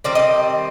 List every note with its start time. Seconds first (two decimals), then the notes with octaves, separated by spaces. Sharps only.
0.04 D#3 G3 C4 D5
0.15 D#5